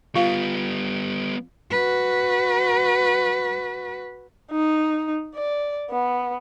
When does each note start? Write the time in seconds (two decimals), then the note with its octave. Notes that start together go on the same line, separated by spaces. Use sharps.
0.15 G3 B3 F4 F5
1.71 F#4 B4
4.52 D#4
5.35 D5
5.90 B3